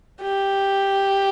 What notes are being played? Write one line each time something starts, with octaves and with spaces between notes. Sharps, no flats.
G4